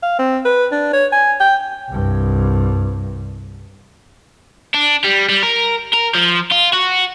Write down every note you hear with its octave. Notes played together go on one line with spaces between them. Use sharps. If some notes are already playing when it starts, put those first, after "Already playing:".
F5
C4
B4
D4
C#5
G#5
G5
C2 G2
D4
G3
G3
A#4
A#4
F3
F4
F#4